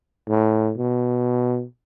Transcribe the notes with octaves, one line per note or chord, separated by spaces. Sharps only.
A2
B2